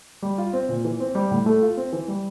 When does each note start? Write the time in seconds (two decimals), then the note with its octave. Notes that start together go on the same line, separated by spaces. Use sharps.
0.22 G3
0.38 F4
0.53 C4
0.69 A#2
0.85 E3
1.00 C4
1.15 G3
1.31 A2
1.46 A3
1.62 F4
1.77 C4
1.93 E3
2.08 G3